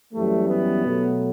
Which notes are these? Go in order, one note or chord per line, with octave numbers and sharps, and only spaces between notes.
F#2 E3 G3 A3
B3
B2 F#3 A3